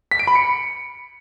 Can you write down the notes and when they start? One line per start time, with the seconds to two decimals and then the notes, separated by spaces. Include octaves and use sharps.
0.11 B6
0.19 D7
0.27 B5
0.35 C#7